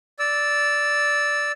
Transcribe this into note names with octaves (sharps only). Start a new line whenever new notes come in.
D5 E6